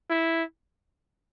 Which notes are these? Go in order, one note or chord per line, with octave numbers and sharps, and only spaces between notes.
E4